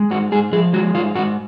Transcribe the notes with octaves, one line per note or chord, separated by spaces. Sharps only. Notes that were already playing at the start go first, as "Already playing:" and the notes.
Already playing: G#3
G#2 F#4
G#2 G#4
F3 G#4
G#3 F#4
G#2 F4
G#2 F#4